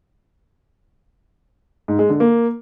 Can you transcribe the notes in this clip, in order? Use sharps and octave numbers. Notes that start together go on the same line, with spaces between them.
G#2
G#3
D3
A#3